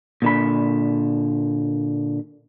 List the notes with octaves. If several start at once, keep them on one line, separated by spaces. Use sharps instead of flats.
A#2 D3 B5